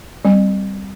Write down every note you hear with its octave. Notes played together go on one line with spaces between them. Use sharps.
G3 C4